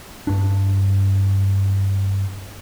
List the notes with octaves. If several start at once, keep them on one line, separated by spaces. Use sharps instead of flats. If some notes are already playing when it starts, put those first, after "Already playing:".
G2 D4